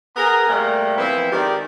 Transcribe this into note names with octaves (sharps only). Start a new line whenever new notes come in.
B3 G#4 A#4 A#5
C3 G3 A3 A#3 C4 A#4
E3 F3 B3 C4 E4 F4
D#3 G#3 C4 G4 A#4 D5